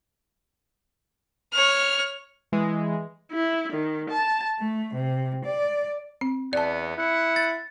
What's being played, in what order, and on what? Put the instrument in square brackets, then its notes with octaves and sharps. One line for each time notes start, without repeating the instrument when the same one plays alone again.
[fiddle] C#5 F6
[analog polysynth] E3 G#3
[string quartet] E4
D#3
A5
A3
C3
D5
[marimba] C4
[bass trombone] E2 [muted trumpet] B3 [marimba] D5 A5
[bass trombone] E4 [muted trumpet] F#5
[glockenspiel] A6